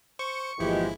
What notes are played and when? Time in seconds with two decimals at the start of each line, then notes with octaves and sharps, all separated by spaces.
0.19 C5 C#6
0.59 G1 A#2 E3 F3 G#3 E4 G4